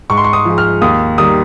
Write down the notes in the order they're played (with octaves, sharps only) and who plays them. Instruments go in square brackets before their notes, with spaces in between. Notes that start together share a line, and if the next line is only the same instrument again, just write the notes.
[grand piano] G#2 C#6
C6
C#6
D#6
F3 G#3
F6
D#2 D#6
D#3 G3 D#6